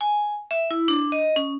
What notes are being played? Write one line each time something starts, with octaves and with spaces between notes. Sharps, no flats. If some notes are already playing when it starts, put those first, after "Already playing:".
G#5
E5
E4
D4
D#5
C#4